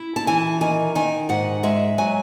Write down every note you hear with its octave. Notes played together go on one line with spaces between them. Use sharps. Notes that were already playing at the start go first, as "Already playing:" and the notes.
Already playing: E4
A5
E3 G#5
D#3 G#5
D#3 G#5
G#2 F#5
G#3 E5
F#3 G#5